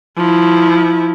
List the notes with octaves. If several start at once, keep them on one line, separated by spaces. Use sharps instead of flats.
F3 E4